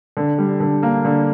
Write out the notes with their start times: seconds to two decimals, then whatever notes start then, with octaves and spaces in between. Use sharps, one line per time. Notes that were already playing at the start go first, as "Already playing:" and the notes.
0.17 D3
0.38 G3
0.60 D3
0.83 A#3
1.05 D3